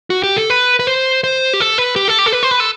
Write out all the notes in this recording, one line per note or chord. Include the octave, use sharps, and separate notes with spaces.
F#4
G4
A4
B4
B4
C5
C5
G4
A4
B4
G4
A4
G4
A4
B4
C5
B4
A4